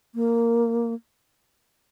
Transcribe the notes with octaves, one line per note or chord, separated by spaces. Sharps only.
A#3